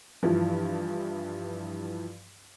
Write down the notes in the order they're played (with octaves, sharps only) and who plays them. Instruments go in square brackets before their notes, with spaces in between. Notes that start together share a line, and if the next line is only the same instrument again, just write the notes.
[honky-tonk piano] G2 E3 F3